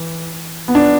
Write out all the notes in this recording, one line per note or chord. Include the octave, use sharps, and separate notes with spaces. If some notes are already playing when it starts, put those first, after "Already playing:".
Already playing: E3
B3
D4